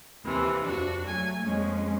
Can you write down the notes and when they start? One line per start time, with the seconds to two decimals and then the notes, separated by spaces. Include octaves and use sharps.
0.25 D#2 C3 E3
0.64 F2 D4 F#4
1.07 F#3 A3 G#5
1.43 F2 G#3 A#3 C#4